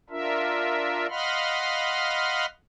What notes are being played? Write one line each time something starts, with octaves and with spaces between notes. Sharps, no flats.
D4 F4 A#4 E5
D#5 F5 F#5 B5 C6 F6